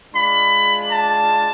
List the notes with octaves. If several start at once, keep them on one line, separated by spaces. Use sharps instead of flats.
G#3 D4 F4 B5
A5